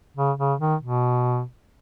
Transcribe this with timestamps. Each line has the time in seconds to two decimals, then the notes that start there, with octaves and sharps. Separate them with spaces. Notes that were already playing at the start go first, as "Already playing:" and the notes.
0.17 C#3
0.39 C#3
0.60 D#3
0.81 B2